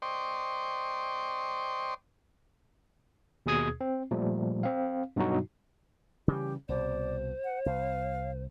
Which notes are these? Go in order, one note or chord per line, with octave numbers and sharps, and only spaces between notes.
C5 D5 D#5 G5 C6 C#6
D#2 B2 G#4 D#6 G#6
C4
A#2 F3 G3 A3
C4 F5
G2 B2 F#3 D#4 F#4
C#3 E3 G3 G4
C2 B2 C5 D5
F#5
C2 F5